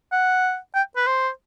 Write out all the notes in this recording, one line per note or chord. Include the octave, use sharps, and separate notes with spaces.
F#5
G5
B4
C5